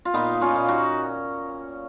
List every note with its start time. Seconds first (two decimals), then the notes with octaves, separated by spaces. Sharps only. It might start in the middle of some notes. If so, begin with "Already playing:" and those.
0.05 F4
0.14 A#2 B3 D#4
0.41 C#4 F4
0.56 A#2
0.68 D#4 F#4